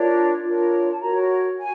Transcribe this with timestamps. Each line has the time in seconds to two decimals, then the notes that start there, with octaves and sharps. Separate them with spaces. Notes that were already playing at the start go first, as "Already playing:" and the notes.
Already playing: D4 F4 A#4 C#5
0.43 D4 F4 A#4 C#5
0.91 A5
1.00 F#4 A#4 C#5 A#5
1.59 F#4 G#5